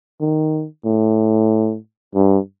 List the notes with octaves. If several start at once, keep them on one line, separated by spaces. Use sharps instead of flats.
D#3
A2
G2